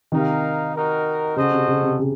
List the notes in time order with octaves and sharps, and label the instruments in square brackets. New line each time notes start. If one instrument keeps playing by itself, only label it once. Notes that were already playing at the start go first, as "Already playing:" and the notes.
[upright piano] C3 D#3 [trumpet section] D#4 A#4 F5
[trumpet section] D#4 F#4 A#4
[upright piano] C#3 [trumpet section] F#4 A4 C5 D#5
[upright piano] C3
C#3
C3
C#3